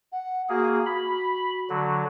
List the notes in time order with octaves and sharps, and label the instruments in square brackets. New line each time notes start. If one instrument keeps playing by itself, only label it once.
[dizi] F#5
[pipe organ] A#3 G#4 [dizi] F#4
[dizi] F#4 [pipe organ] B5
[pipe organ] D3 F#3